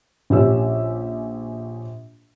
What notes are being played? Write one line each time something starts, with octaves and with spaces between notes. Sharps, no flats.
A#1 C#4 G4 E6